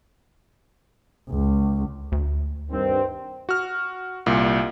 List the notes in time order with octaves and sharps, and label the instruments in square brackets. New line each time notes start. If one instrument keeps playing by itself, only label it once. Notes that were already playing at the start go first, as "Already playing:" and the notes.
[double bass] C#2
[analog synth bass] D2
[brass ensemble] G2 D#3 C4
[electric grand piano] F#4 F6
C2 A#2